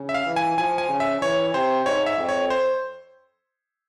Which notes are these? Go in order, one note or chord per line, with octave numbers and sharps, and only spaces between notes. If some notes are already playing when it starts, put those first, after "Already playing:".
Already playing: C#3
E5
F5
E3
G#5
F3 G#5
G#5
C#3
E5
E3 C#5
C3 C5
G#2 C#5
E5
F2
C#5
C5